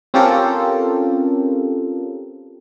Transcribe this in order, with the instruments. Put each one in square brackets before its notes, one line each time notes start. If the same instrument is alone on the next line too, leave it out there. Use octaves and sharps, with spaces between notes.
[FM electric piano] C4 C#4 F4 G4 A4 A#4